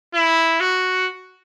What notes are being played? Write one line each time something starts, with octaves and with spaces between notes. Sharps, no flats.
E4
F#4